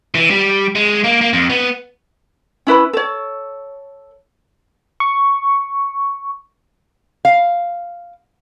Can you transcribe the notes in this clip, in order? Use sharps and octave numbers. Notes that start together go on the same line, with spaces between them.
E3
G3
G#3
A#3
A#3
F2
B3
C#4 E4 B4 B5
A4 C#5
C#6
F5